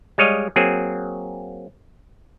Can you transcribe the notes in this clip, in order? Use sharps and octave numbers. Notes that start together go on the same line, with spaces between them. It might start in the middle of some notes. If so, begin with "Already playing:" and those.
G3 G#3 C#5 D#5 F5
F#3 A#3 C4 G#4